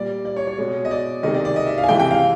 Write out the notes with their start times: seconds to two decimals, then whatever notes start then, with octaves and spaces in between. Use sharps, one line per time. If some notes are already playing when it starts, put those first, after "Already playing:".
Already playing: A#2 G3 D5
0.25 D5
0.36 C#5
0.47 C#5
0.58 B2 G#3
0.85 D#5
0.91 D5
1.23 C3 D#3 G#3 D#5
1.34 D5
1.45 D5
1.56 D#5
1.67 E5
1.78 F5
1.84 G#5
1.89 C3 E3 G#3 G5
2.00 G5
2.11 F5